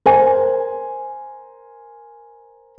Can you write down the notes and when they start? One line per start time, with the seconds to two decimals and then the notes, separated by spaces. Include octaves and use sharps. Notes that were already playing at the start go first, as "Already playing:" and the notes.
0.06 A#4 C5 G#5